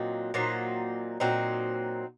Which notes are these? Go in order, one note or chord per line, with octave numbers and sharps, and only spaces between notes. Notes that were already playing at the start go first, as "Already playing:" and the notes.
Already playing: A#2 F#3 C4 D#4
A#2 F#3 C4 D#4
A#2 F#3 C4 D#4